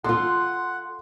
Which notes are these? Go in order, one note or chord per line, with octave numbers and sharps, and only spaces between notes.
F4 A4 F#5 C6